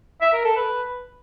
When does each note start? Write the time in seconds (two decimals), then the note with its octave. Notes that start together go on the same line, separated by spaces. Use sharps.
0.21 E5
0.33 A#4
0.45 A4
0.56 B4